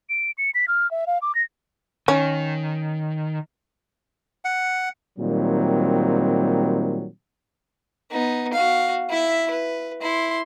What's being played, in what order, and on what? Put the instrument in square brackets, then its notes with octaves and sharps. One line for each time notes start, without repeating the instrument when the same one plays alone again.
[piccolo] D7
C#7
B6
F6
E5
F5
D6
A#6
[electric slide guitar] D#3 [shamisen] C#4
[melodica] F#5
[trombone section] A#2 D#3 F#3 G3 C4
[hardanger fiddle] B3 D#4
F#4 F5
E4 E5
B4
E4 C6